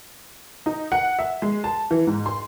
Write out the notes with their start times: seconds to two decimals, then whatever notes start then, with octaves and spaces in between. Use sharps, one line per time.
0.66 D#4
0.92 F#5
1.19 E5
1.42 G#3
1.64 A5
1.91 E3
2.07 G#2
2.26 C6